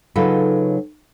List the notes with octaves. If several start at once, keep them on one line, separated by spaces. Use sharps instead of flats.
C#3 F#3 D#4 F4 A4 B4